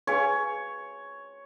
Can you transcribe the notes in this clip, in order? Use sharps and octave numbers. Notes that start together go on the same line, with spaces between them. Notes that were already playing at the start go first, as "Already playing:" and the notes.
G#4 B4 C#5 F5 G#5 C#6